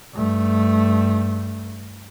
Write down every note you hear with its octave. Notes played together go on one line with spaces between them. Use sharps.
G2 A3